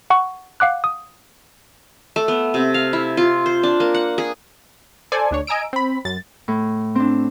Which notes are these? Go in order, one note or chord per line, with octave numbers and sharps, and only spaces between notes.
F#5 C#6
F5 F#5 D6 F#6
D#6
A3
B3
C3
F5
E4
F4
C5
D4
A#3
F#5
G#4
A4 C5 D5 G#5
D2 D4 C#5
D#5 G#5 A#5 E6 D7
C4 B5
F#2 A6
A2
C4 D4